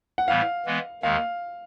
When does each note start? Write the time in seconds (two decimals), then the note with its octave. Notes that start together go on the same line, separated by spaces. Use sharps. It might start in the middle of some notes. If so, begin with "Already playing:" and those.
0.18 F#5
0.28 A2 E3 G3 B3 F5
0.66 E3 G#3 B3
1.03 D#2 D#3 G#3 F5